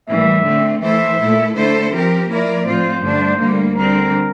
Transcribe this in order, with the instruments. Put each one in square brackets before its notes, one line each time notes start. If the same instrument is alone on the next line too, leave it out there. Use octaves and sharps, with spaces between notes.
[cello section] A2 E3 G3 A#3 [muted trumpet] E5
[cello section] D3 A3 C4
[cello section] E3 A3 E4 A4 C5 [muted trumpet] E5
[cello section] A#2 A3 E4 A4
D3 A3 E4 A4 C5
F3 C4 G4 A#4
F3 A#3 E4 A#4 D5
[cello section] A2 F3 C4 F4 [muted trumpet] C5
[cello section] G2 D3 A3 D4
D2 D3 G3 A#3
[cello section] D3 G3 C4 [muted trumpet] A#4